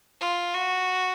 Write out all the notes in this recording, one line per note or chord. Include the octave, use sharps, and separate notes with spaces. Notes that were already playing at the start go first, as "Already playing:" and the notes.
F4
F#4